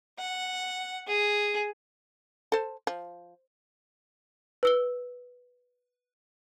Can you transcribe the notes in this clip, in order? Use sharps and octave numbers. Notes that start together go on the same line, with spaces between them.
F#5
G#4
A4 C5
F3
B4 E6 G7